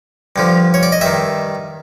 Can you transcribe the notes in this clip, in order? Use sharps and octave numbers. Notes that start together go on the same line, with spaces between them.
G2 D3 F3
C#5
D5
D#5
G2 D#3 E5